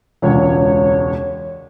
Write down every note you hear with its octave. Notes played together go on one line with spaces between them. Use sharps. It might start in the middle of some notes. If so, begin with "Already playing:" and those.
E1 C#2 C#5